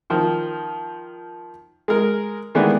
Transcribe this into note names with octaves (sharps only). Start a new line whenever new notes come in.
D#3 F3
G#3 A#4
D#3 E3 G#3 A3 B3 D4